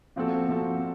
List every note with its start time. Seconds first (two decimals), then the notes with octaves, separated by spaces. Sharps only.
0.16 A#2 F3 C4 F#4 A4
0.48 A#2 F3 C4 F#4 A4